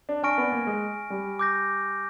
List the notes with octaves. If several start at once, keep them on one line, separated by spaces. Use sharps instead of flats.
D4
D4 G#5 C#6 F6 A#6 D7
B3
A#3
G#3
G3
D6 G6 A#6